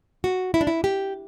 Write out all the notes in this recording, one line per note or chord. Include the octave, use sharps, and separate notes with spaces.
F#4
E4
D4
E4
G4